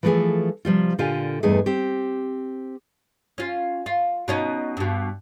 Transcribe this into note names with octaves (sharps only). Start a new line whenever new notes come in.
E3 F3 A3 B3 G#4 A4
C3 F3 G3 F4
A#2 D3 F4 G4 F5 G#5
E2 G2 A3 D#4 G#4
C4 G4
C#4 F4
F4
B2 C#4 D#4
G2 B2